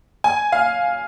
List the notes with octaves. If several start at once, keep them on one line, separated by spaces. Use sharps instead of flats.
G#5
F5